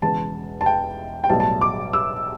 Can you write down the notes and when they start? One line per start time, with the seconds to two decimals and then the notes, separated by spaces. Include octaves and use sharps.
0.02 E1 E2 C#3 A5
0.61 A5
0.66 G5
1.24 G5
1.29 B1 A2 G3 A5
1.40 A5
1.61 D6
1.93 E6